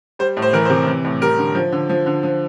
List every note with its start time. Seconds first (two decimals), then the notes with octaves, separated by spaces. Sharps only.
0.19 G3 C5
0.37 A2
0.42 C5
0.53 E3 A#4
0.65 C3 C5
0.87 E3
1.05 A2
1.21 G3 A#4
1.38 D3
1.55 F3
1.72 D3
1.90 F3
2.06 D3
2.23 F3